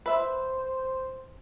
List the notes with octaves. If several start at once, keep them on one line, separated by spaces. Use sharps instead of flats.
B4 C5 E5